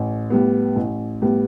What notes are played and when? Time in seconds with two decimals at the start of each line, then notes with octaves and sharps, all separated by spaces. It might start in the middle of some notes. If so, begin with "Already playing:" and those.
Already playing: A1
0.30 A2 G3 B3
0.76 A1
1.22 A2 G3 B3